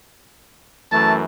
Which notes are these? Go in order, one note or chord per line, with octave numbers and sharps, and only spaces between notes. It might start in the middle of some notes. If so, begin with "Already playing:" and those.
F#2 E3 A3 A5